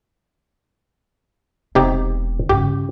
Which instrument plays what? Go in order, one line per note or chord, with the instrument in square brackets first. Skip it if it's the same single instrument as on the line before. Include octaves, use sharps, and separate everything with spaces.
[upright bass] E1 [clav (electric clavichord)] C3 D#4 G4
[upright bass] G2 C#3 [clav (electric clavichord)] G4